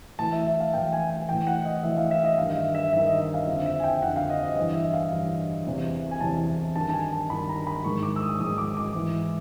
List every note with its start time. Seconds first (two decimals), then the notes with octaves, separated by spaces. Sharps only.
0.19 A2 E3 A5
0.32 E5
0.47 E5
0.60 F5
0.73 A2 E3 G5
0.93 G#5
1.10 G#5
1.28 A2 E3 G5
1.47 F#5
1.65 D#5
1.83 A2 E3 E5
1.98 F5
2.11 E5
2.24 D#5
2.38 G2 D#3 F5
2.56 E5
2.75 E5
2.92 G2 D#3 E5
3.07 D#5
3.20 E5
3.34 F5
3.47 F2 D3 E5
3.66 E5
3.80 G#5
3.83 G5
4.02 F2 D3 F#5
4.16 F5
4.30 D#5
4.43 D#5
4.56 G2 E3 D#5
4.75 E5
4.93 F5
5.12 G2 E3
5.66 E2 C3 E3
6.11 G#5
6.20 E2 C3 E3 A5
6.76 G2 D#3 A5
6.90 A5
6.93 G#5
7.13 A5
7.30 G2 D#3 B5
7.49 A#5
7.67 B5
7.84 G#2 D#3 C#6
8.03 D6
8.16 E6
8.22 D#6
8.40 G#2 D#3 D#6
8.58 D6
8.77 D6
8.95 G#2 E3